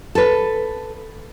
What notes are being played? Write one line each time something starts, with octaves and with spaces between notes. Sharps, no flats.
A4 B4